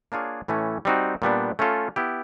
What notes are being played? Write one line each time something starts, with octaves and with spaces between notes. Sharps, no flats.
A#3 D4 F4 G#4 C#5
A2 E3 A3 C#4
G3 C4 D#4 F#4
A#2 G3 B3 D4
A3 C#4 F4 A4
B3 E4 G4